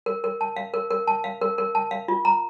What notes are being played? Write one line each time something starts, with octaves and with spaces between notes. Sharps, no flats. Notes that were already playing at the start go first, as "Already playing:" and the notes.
A#4
A#4
A5
F5
A#4
A#4
A5
F5
A#4
A#4
A5
F5
F4
A#5